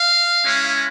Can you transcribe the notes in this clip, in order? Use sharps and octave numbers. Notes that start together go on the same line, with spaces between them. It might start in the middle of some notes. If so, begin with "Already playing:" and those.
Already playing: F5
G#3 C#4 E4